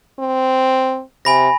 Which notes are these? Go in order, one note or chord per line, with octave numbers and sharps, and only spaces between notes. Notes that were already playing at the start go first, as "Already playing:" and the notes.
C4
C3 G#5 B5 A#6